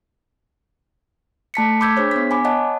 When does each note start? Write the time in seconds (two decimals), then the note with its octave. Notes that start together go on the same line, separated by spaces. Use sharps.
1.54 A3 A5 B6 C#7
1.81 B5 D6 E6 G6 G#6 B6
1.97 D4 G#4 C5 C#5
2.11 B3 B6
2.31 G#5 B5 D6
2.44 C#5 D#5 F#5 A5